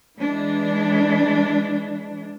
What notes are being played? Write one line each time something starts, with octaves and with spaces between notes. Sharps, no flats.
E3 G#3 D4